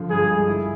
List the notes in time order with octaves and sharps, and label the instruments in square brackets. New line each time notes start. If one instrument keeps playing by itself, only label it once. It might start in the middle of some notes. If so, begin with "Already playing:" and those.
Already playing: [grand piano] D3 F3
[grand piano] G2 [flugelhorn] G#4
[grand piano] G#3
E4